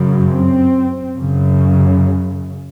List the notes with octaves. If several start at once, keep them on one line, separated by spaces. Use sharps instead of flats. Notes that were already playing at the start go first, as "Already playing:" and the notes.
Already playing: F#2 C#3
C4
F#2 C#3